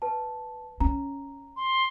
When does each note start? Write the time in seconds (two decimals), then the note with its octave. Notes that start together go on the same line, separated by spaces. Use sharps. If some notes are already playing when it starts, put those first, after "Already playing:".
0.02 B4 A5
0.80 C#4 A#5
1.56 C6